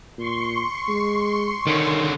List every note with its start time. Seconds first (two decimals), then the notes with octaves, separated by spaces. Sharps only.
0.18 A#2 C6 C#6
0.88 G#3
1.67 D3 D#3 C#4